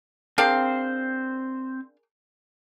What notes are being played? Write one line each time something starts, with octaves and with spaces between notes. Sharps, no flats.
C4 D4 G#4 A#4 C5 F5 G5